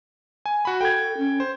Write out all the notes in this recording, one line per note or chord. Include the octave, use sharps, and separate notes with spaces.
G#5
F#4 B5
A4 G5 G#6
C#4
C5